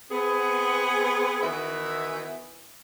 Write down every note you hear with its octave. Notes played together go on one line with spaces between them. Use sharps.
B3 C4 G#4
D#3 E3 B3 E4 F#4 E5